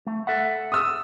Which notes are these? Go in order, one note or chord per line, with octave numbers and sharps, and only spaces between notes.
A3
A4 E5 F#5
D#6 E6